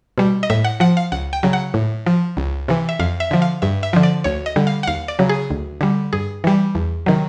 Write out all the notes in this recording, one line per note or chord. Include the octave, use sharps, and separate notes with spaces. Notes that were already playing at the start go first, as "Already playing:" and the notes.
B2 G3
D#5
A2 E5
F#5
F3 F#5
F5
C#2 F#5
G5
C#3 F#3
F#5
A2
F3
C#2
C3 E3
E5
F2 F5
E5
D3 F3
F5
G2 E5
E5
D3 F3
D5
D2 C#5
D#5
D3 G3
F5
F#5
D#2 F5
D5
C#3 F#3
G#4
D2
D3 G3
G2 G#4
E3 G3
E2
C3 D#3 F#3